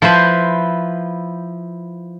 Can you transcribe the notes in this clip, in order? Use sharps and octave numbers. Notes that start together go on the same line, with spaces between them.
F3 E4 B4 C5